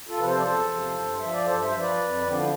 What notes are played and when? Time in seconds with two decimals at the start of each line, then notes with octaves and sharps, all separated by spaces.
0.08 F4 A4
0.17 C3 F3 B4
0.26 A4 C5
0.38 D5
0.42 E2 A4 C5
0.68 C3 F3
0.94 G2
1.20 F3 E5
1.32 D5
1.45 G2 A4 C5
1.62 C5 E5
1.71 F3
1.80 B4 D5
1.97 F2
2.22 D3 F3 C4
2.33 D4
2.40 E4